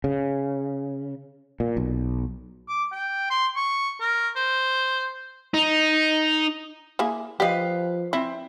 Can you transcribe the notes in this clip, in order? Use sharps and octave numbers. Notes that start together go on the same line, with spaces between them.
C#3
A#2
B1
D6
G5
C6
C#6
A#4
C5
D#4
A#3 E4 G#4
F3 G4 B4 D#5 F5
C4 E4